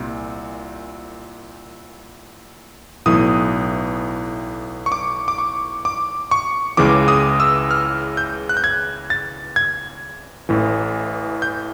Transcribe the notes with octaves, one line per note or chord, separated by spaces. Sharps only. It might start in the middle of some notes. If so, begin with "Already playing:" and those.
Already playing: C2 A#2
B1 A2 E3 D#6
C#6
D6
D6
C#6
D6
C#6
C#2 C#3 E3 D6
D#6
E6
F6
G6
F#6
G6
G#6
A6
G#6
A1 A2 E3
G6